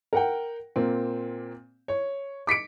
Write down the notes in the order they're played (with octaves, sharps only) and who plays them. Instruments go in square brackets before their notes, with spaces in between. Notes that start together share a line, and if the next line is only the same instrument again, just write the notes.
[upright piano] A#4 F#5 G5
A#2 A#3 C4
C#5
D6 B6 C#7 D7